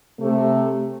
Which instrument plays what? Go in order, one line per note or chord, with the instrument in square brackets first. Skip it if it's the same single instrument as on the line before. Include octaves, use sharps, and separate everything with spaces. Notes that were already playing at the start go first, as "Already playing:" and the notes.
[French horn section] C3 A3